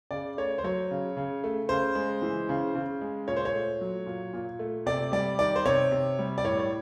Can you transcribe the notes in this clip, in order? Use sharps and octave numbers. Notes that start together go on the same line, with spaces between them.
C#3 D5
A3 C#5
C5
F#3 C#5
C#3
C#3
A3
C#3 C5
G#3
E3
C#3
C#3
G#3
A#2 C#5
C5
C#5
A3
F#3
A#2
A#2
A3
C3 D5
G3 D5
D#3 D5
C5
C3 C#5
C3
G3
D5
A2 C#5
C#5